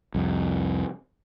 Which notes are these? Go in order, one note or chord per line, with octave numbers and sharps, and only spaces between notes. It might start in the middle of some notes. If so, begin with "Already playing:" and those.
C2 F2